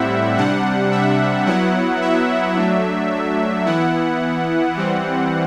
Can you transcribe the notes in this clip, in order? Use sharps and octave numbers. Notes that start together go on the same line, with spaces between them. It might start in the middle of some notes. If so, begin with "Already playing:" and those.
Already playing: A2 G3 C4 E4 E5 F#5
C3 G3 D4 F#5
E5
F#3 B3 E4 F#5
E5
F#3 A3 D4
E3 B3 E4 F#5
E3 G3 C4